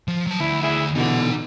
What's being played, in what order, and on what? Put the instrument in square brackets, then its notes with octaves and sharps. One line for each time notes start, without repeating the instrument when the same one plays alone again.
[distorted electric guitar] F3
F#3 A5
[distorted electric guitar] D2 [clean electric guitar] E4
[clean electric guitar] E4 G#4 E5
[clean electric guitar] B2 D3 E3 [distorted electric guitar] D#4 F#5